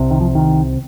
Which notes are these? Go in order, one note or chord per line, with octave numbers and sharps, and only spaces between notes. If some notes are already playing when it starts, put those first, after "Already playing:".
Already playing: C2 C3
D#3
F3
D#3